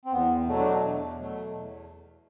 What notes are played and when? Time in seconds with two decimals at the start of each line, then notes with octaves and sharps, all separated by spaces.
0.05 C4
0.12 E2 B3
0.47 B2 F#3 A3
0.59 D4
0.81 E2
1.17 B2 F#3 A3
1.51 E2